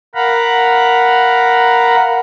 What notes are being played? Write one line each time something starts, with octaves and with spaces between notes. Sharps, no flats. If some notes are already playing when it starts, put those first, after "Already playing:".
A#4 F5 F#5 A#5 B5